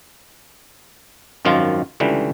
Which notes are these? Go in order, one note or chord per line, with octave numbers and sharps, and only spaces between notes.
G#1 F#2 D#3 F3 F4
C#2 D3 E3 G3